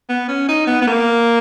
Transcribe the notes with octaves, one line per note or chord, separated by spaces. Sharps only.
B3
C#4
D#4
B3
B3
A#3